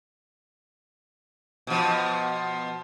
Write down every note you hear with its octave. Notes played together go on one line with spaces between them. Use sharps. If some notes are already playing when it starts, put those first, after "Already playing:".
B2 F3